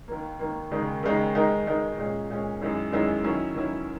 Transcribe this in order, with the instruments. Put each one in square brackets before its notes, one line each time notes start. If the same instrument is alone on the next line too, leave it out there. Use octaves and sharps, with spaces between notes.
[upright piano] D#2 D#3 A#3
D#2 D#3 A#3
D#2 C#3 G#3 D#4
D#2 C#3 G#3 D#4
D#3 G#3 D#4 A#4
D#3 G#3 D#4 A#4
A#2 G#3 C#4
A#2 G#3 C#4
F#2 D#3 G#3 C#4 E4
F#2 D#3 G#3 C#4 E4
D#3 F#3 C#4 E4
D#3 F#3 C#4 E4